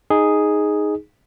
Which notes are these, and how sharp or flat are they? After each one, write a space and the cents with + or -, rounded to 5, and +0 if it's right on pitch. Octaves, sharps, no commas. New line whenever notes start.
D#4 +0 G#4 +0